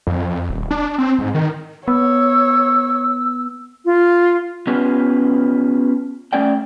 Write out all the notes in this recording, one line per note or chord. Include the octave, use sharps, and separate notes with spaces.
F2
F2
D#1
D4
C4
G#2
D#3
B3 C#5 E6
F4
B3 C#4 F4 G4 B4
A3 C#4 D5 G5